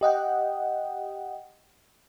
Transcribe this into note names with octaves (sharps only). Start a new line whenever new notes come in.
G4 D#5 F#5 G5